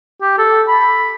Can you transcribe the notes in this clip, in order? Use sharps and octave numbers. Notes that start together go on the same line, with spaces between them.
G4
A4
B5